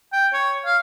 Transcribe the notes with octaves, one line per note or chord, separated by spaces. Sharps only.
G5
C#5
F5